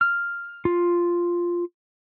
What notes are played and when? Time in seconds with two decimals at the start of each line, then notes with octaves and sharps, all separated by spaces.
0.01 F6
0.65 F4